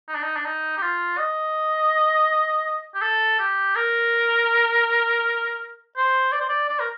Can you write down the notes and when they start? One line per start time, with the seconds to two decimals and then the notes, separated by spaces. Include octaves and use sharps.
0.08 D#4
0.15 D4
0.23 D#4
0.36 D4
0.45 D#4
0.77 G4
0.82 F4
1.18 D#5
2.94 G4
3.02 A4
3.39 G4
3.76 A#4
5.96 C5
6.32 D5
6.40 C5
6.49 D5
6.69 D5
6.80 A#4